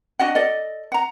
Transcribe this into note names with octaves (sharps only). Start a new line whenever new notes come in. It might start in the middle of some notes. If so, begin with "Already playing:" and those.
D4 F#4 D#5 F#5
A4 D5 D#5
F#5 A#5